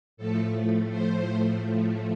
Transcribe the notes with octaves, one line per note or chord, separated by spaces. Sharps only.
A2 F3 A3 A4
C5
A2 F3 A3